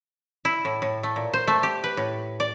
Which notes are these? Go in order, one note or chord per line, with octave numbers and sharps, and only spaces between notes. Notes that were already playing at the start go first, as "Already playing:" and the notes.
E4
A2
A2
A3
A#2
C5
A3
G4
B4
A2
D5